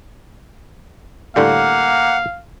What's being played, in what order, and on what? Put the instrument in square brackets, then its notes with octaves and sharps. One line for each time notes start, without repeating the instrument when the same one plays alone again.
[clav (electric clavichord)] A2 D3 G3 [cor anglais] A#3 [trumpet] F5 [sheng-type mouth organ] F#5